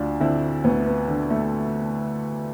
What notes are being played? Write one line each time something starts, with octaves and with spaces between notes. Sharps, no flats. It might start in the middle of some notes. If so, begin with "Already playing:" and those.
Already playing: D2 D4 F4
D3 C4 E4
D2 B3
B3
D3
A3